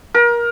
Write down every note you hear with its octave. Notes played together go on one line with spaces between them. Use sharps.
A#4